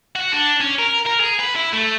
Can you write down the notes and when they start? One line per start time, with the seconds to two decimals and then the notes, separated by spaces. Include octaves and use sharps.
0.16 F#4
0.32 D4
0.60 C#4
0.79 A#4
1.07 A#4
1.20 G#4
1.39 B4
1.55 E4
1.73 A3